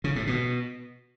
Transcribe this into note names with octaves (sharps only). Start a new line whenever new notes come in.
C#3
A2
B2